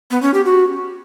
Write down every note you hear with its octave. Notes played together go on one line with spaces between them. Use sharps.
B3
C#4
G4
F#4